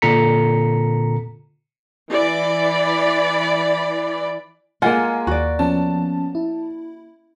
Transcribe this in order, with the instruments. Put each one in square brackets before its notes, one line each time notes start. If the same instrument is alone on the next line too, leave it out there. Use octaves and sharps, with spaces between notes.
[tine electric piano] A#2 D3 A4 A#5 B6 C#7
[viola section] E3 D5 B5
[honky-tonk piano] G#3 G#5 [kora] A#3 F4 [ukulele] F#5
[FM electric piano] D#2 [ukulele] F#4 D5
[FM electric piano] F3 B3 C#4 [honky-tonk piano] A5
[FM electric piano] E4